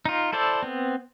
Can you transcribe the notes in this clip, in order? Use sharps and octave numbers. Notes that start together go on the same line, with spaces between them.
D#4 F4
E4 A4 C5 D5
B3 C4